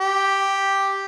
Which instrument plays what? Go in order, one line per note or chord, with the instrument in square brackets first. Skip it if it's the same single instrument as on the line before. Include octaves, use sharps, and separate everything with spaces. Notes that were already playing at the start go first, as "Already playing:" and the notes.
[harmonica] G4